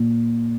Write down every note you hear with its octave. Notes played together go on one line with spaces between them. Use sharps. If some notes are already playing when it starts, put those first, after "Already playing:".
Already playing: A#2